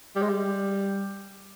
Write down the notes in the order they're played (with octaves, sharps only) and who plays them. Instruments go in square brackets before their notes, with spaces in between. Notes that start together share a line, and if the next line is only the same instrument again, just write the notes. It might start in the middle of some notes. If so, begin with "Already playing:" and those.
[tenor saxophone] G3
G#3
G3